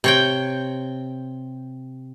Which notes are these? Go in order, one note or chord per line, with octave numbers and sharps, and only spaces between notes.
C3 C#5 G5